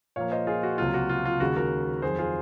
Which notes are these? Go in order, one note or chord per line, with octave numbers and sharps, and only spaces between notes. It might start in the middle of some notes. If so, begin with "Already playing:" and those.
A#2 F3 A#3 C#5 F5
C5 D#5
F4 G#4
F#4
C#2 C3 F#3 A#3 F4
F#4
F4
F4
D#2 C#3 G#3 F#4
F#4 A#4
F2 D#3 F#3 G#4 C5
F4 G#4